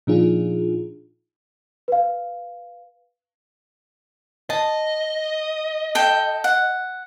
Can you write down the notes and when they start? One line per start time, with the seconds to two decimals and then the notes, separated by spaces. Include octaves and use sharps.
0.07 A#2 F3 D4 D#4 F4 G#4
1.88 B4 F5
4.50 D#5 A5
5.95 A4 G5
6.44 F#5